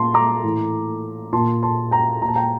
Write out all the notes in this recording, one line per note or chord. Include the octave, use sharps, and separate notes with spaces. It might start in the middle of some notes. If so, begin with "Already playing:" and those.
Already playing: A#2 A5 C6
A#5 D6
A2 E3
A#2 A5 C6
A5 C6
G5 A#5
A#2 A#5
A5
G5 A#5